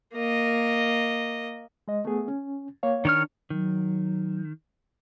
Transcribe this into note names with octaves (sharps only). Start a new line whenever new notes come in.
A#3 D#5
G#3 D#5
A3 B3 G#4
C#4
A#3 C#5 F5
D#3 D4 C#5 F6
D#3 F#3